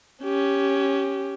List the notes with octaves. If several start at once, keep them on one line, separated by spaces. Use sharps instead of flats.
C#4 G4